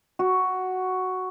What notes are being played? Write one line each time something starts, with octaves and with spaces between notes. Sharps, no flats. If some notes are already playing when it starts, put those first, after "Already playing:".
F#4